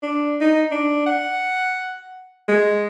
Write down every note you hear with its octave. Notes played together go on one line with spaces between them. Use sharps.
D4
D#4
D4
F#5
G#3